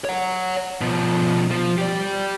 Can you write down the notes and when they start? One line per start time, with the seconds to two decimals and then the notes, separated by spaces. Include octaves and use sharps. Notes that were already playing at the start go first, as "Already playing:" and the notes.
0.05 C#5 F#5
0.81 B2 F3
1.51 F3
1.78 G4 D5